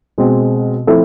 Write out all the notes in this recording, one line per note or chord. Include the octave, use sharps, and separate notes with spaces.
B2 G#3 C4
F3 A3 C4 E4 A4